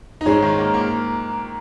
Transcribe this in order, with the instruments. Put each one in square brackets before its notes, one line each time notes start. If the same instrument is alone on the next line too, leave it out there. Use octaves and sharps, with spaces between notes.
[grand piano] D#4
[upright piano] G#2 [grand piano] G#3 C#4
[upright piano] D#3
A#3
A#3